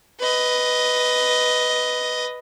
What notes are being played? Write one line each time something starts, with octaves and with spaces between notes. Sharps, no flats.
B4 D#5